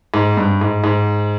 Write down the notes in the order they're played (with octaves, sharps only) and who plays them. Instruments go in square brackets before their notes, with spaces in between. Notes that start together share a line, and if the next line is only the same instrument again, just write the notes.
[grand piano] G#2
G2
G#2
G#2